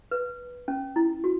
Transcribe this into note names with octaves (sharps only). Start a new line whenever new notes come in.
B4
C#4
E4
F#4